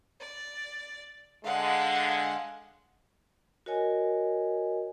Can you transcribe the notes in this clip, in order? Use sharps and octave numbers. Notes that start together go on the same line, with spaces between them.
D5
D3 G#3 F5 F#5
F#4 A#4 C#5 D#5 G#5